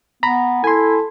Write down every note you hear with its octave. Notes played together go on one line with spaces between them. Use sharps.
B3 A#5 B5
E4 A4 G#5 C6